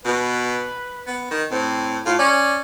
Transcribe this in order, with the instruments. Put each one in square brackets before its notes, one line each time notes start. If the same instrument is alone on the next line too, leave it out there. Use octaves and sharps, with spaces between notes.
[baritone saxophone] B2 [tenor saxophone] B4
[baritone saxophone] B3
D#3
[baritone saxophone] A2 [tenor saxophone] C4
[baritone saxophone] A2 [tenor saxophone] F4
[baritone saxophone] C#4 [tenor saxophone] D5